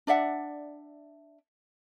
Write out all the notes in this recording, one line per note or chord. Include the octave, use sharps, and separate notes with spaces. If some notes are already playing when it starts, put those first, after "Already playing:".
D4 D5 E5 F#5